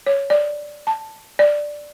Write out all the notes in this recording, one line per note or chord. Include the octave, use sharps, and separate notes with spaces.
C#5
D5
A5
D5